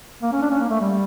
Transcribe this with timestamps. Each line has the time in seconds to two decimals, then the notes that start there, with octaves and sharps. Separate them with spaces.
0.22 A#3
0.32 C#4
0.42 D4
0.51 C#4
0.60 A#3
0.70 A3
0.80 G3